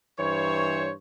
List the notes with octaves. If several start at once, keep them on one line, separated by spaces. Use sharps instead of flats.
G2 E3 C5 C#5